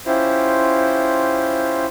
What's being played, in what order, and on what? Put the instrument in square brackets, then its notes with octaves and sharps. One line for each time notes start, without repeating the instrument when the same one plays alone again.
[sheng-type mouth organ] C#4 E4 F4 G4 C5